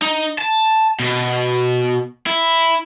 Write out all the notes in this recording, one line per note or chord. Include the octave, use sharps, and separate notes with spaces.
D#4
A5
B2
E4